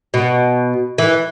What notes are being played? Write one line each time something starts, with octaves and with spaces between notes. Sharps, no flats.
B2
E3